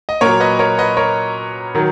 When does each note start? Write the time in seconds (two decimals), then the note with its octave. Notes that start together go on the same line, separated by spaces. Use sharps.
0.09 D#5
0.21 A#2 F#3 A#4 C#5
0.40 B4 D#5
0.59 A#4 C#5
0.78 B4 D#5
0.97 A#4 C#5
1.75 D#3 F#3